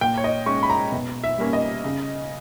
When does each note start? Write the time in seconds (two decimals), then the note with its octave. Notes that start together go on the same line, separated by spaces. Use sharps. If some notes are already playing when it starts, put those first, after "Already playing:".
0.01 A#2 G5
0.17 C#5
0.24 D#5
0.46 G#3 C#4 C#6
0.63 B5
0.70 A#5
0.92 B2
1.24 E5
1.38 G3 A#3 C#4
1.53 D#5
1.84 C#3